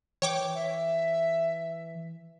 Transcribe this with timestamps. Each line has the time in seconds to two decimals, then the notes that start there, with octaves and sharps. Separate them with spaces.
0.22 E3 C#5 G5 D6
0.55 E5